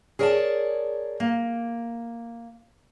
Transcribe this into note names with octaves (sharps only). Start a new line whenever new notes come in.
G#4 A#4 C#5 D5 E5 A5
A#3